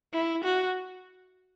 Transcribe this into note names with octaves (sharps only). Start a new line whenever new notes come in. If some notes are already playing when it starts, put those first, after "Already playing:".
E4
F#4